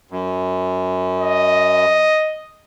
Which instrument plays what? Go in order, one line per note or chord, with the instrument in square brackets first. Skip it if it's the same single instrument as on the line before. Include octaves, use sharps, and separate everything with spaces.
[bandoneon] F#2
[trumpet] D#5